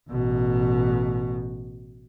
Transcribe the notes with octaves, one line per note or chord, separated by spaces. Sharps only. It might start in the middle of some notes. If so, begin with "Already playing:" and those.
A1 B2